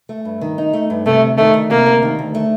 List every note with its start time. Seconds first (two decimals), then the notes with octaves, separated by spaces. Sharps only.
0.09 A3
0.25 G2
0.41 D#3
0.58 D#4
0.73 A3
0.90 G2
1.06 C3 A3
1.21 D2
1.38 D#3 A3
1.54 D2
1.71 C3 A#3
1.86 D2
2.03 D#3
2.19 D2
2.35 A3